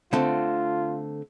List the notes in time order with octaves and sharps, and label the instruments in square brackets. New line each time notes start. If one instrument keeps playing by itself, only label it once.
[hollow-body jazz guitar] D3 A3 C4 [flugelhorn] F4